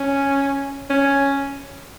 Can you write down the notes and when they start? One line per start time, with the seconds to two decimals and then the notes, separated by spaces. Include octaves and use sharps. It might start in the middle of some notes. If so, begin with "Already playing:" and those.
Already playing: C#4
0.90 C#4